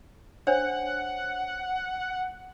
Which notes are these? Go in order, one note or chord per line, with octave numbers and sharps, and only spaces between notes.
D4 C5 C#5 F#5